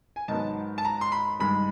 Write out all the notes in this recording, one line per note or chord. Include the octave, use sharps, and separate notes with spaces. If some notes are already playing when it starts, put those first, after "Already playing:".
G#5
G#2 D#3 F#3 B3 A5
A5
A#5
C6
B5
G2 D#3 G#3 B5